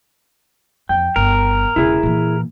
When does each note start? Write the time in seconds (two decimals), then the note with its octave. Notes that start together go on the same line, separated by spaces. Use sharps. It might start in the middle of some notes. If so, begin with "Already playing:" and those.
0.89 F2 G5
1.16 G1 A#4
1.76 E1 C#3 E4 G#4
2.03 A#2 E3